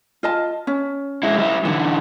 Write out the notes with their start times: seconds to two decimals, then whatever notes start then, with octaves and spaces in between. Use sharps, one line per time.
0.23 F4 D#5 A5
0.67 C#4
1.23 G#3 E4
1.38 G3 E4
1.65 D3 E3 F#5